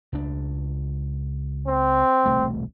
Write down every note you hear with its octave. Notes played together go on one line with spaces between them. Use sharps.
C#2 D4
C4
E1 C2 A3